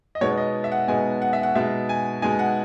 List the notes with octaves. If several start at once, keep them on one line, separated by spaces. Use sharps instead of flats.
D#5
B2 G#3 B3 D#4 C#5
D#5
E5
F#5
B2 G#3 B3 D#4 G#5
F#5
E5
F#5
B2 G#3 D#4 E5
G#5
B2 G#3 D#4 G#5
F#5